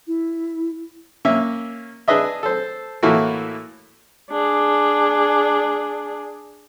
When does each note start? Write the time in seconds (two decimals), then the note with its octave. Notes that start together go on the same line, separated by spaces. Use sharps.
0.07 E4
1.25 A#3 C#4 E5
2.08 D4 G#4 B4 D#5 E5
2.43 A4 C5
3.03 A2 E3 A3 A#3 E4 F#4
4.31 D4 G#4